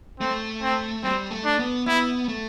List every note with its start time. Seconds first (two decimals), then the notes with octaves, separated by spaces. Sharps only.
0.20 A3 C4
0.63 C4
1.03 G3 C4
1.31 A3
1.45 D4
1.59 B3
1.86 B3 E4
2.28 A3